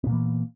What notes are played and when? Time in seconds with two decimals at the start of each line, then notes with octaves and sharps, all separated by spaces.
0.04 B3
0.07 A#2
0.09 A#3
0.12 E3